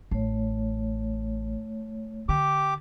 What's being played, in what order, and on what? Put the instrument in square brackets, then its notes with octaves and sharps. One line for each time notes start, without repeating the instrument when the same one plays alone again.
[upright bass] A1 [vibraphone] A3 C#5
[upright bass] D3 [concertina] G4 D6